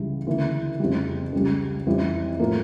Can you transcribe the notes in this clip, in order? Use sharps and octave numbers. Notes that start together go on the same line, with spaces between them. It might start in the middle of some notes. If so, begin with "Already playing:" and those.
Already playing: C#2 C#3 E3 G3
D2 C#3 E3 A#3 E4
F2 C#3 G3
C#2 C#3 G3
F2 E3 G3 C#4 E4
A2 F3 A#3